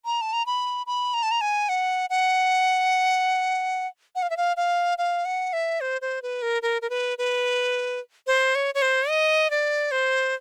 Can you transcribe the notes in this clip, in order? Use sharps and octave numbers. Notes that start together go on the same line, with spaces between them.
A#5
A5
A#5
B5
B5
A#5
A5
A#5
G#5
F#5
F#5
F#5
F5
E5
F5
F5
F5
F#5
E5
C5
C5
B4
A#4
A#4
A#4
B4
B4
C5
C#5
C#5
C5
D#5
D5
C5